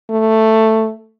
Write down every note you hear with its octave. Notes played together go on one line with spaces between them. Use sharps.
A3